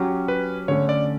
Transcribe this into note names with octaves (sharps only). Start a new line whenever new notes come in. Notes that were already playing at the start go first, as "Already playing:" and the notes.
Already playing: F#3 C#4 G4
B4
D3 A3 C#4 C#5
D5